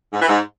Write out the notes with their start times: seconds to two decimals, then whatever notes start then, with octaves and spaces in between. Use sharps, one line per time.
0.13 G#2
0.20 E3
0.28 G#2